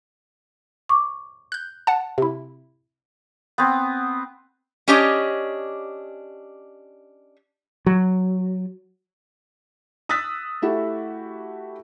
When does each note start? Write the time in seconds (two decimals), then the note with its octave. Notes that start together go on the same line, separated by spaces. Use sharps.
0.89 C#6 D6
1.52 F#6 G6
1.87 F#5 A5
2.18 C3 E4
3.58 B3 C4
4.88 C#4 D4 G4 C#5 D#5
7.86 F#3
10.09 D#6 E6 F#6 A6 B6
10.62 A3 E4 F#4 G4